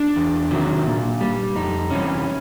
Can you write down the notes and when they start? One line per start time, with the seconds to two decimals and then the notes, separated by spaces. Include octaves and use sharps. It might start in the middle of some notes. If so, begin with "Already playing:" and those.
Already playing: D4
0.16 E2
0.51 C3 D#3 F#3
0.86 A#2
1.20 G3
1.56 F2 D#4
1.90 C3 E3 G3 C#4